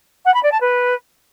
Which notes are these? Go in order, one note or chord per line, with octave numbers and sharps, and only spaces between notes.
F#5
B5
D5
A5
B4